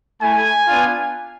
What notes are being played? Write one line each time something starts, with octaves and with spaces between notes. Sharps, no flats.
A3 E4 G#5
B3 D4 F4